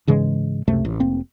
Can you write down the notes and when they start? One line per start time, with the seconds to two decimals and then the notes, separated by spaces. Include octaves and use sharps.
0.07 G#2 C#3 E3 G#3
0.67 C#2 F#2 C3 A3
0.85 A1
1.00 F1 A#3 C4